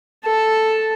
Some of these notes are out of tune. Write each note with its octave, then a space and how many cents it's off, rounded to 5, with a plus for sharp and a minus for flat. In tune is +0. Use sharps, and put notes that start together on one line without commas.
A4 +0 A5 +0